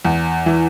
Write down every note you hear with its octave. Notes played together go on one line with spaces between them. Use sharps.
E2
E3